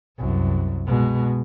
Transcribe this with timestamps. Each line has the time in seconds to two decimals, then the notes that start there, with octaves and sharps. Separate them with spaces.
0.18 C2 F#2
0.86 B2 G#3